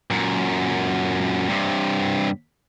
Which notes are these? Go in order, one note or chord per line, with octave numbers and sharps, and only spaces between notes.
F#2 A#2
G2 C3